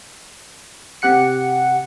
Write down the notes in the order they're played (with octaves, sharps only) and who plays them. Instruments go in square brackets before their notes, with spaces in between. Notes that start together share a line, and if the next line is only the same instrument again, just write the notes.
[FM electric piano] C3 G4 F#5 C#7